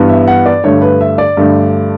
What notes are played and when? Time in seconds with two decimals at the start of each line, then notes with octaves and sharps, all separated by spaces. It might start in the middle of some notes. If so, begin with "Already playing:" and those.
Already playing: G2 E3 B3
0.09 E5
0.28 F#5
0.46 D5
0.64 G2 D3 A3 C#5
0.82 B4
1.01 E5
1.18 D5
1.37 G2 D3 A3